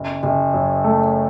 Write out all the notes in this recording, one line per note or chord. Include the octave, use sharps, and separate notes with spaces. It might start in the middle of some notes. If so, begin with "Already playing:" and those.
Already playing: F#1
F#1
F#2
A3